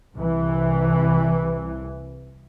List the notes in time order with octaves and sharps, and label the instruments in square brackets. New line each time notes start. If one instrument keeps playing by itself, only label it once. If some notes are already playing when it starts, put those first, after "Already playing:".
[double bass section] C2 E3